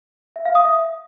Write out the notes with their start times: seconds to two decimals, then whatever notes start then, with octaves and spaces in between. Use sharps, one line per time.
0.36 E5
0.45 F5
0.55 D#6
0.65 E5